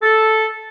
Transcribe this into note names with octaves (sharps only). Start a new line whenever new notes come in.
A4